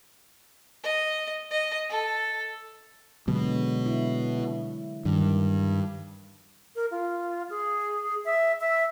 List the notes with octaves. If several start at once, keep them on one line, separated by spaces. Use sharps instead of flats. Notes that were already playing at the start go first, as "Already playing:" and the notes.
D#5
D#5
A4
B2 D3 F#3 G#3
E4
E4
G2 D#3
A#4
F4
G#4
E5
E5